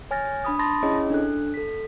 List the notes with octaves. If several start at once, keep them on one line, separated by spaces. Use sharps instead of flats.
C#5 G#5 F6 A6 A#6
D4 B5 D#6
A5 B5 C6 D#6 A6 A#6
C#4 E4 G#4 C#5 D#5
D4 A4 F#6
A4 B6